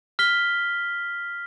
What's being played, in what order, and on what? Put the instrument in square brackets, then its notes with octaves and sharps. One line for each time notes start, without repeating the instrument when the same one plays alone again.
[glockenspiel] F6 B6 G7